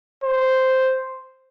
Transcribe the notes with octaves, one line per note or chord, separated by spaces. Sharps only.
C5